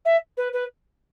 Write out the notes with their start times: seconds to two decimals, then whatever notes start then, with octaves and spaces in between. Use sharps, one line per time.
0.05 E5
0.37 B4
0.53 B4